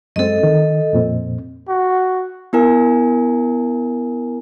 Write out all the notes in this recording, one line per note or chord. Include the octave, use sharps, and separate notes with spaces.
F#2 G#3 C4 A4 D#5
D#3
F2 A#2 C4
F#4
B3 E4 A#4 G#5